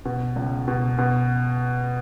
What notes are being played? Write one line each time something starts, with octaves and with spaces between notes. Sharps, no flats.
B2
C#2
B2
B2